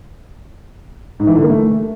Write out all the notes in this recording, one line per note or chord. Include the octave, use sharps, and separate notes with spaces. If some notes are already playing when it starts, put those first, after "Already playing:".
G#2
E3
D3
A#3
A3